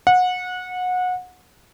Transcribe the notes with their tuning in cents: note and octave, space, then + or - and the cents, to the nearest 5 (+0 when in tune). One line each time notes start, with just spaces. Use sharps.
F#5 -25